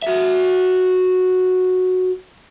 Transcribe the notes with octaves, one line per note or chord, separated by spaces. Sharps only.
F#4 E5